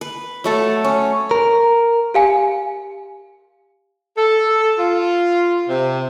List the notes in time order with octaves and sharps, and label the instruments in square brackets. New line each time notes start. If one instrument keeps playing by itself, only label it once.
[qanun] B4
F#3 A3 A4
C#4
[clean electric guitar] A#4
[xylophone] G4 F5 G#5
[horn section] A4
F4
C3